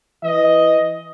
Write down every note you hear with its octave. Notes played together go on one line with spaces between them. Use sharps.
E3 D#5